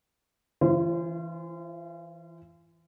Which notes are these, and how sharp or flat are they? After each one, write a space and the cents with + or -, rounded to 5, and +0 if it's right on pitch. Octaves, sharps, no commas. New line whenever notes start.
E3 +0 F4 -35 C5 +10